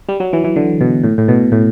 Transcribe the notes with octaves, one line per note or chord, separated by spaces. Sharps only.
G3
F#3
E3
E3
D3
B2
A2
A2
B2
A2